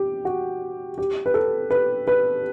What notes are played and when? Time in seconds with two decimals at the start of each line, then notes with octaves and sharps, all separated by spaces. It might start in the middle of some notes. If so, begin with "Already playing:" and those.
Already playing: G4
0.25 F#4
0.98 G4
1.26 B4
1.34 A4
1.71 B4
2.08 B4